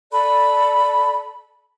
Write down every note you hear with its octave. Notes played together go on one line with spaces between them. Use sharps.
A4 D5 B5